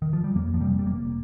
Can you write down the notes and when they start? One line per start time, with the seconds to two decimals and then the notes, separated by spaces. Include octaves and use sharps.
0.02 D#3
0.13 F3
0.24 G3
0.35 F2 A#3
0.54 F3
0.60 C3 G3
0.79 G3
0.86 F1 A#3